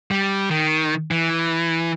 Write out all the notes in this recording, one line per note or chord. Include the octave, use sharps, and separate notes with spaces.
G3
D#3
E3